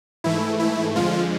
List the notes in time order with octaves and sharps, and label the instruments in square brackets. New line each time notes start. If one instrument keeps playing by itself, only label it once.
[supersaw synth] G#2 E3 A3 E4
E4
F2 D3 F3 G#3 F4